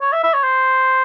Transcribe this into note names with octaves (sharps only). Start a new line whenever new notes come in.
C#5
E5
E5
C#5
C5